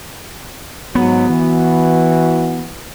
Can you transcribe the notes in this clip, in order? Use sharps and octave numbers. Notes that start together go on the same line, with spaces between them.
G#2 F#3 B3
E3 F#4